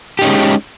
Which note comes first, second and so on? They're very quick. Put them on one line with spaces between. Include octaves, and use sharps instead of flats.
G4 D#4 C#4 G#3